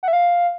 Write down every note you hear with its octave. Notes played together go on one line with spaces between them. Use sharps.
F#5
E5
F5